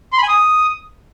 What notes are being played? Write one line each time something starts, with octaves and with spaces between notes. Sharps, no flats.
C6
B5
G#5
D#6